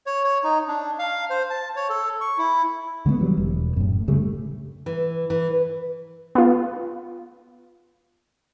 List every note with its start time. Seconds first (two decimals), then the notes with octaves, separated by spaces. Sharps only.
0.06 C#5
0.24 C#5
0.44 D#4
0.68 D4
0.99 F5
1.30 C5
1.50 A5
1.76 C#5
1.90 A4
2.21 C#6
2.38 E4
3.06 D3 G#3 A#3 B3
3.20 E3 F#3 G3
3.37 E1
3.76 F#2 A2
4.08 D2 C#3 G3 A3
4.86 E3
5.30 E3
6.35 B3 F4